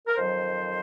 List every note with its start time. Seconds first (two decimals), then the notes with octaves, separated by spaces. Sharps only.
0.08 A#4
0.17 F2 D#3 F#3 C5